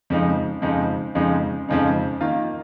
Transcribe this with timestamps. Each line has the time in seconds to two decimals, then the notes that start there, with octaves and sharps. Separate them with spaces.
0.10 F2 C#3 F3 G#3 D#4
0.62 F2 C#3 F3 G#3 D#4
1.15 F2 C#3 F3 G#3 D#4
1.69 F2 C#3 F3 G#3 D#4
2.21 D#3 A#3 F4